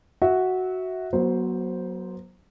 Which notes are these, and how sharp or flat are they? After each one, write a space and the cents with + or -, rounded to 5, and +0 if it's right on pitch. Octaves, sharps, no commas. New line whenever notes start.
F#4 +0 E5 -20
F#3 +0 B3 -40 C5 +0